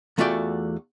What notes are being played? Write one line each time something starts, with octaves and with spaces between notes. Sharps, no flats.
E2 A3 F4 F#4 D5 G5